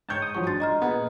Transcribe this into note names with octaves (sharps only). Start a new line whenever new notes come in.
G#2 C#5 G5 A5 G6 C#7
D#6
G#1 F3 F#3 F#4 C#6
G#2 D4 C6 A6
D#5 A#5 F6
A#2 B3 G#4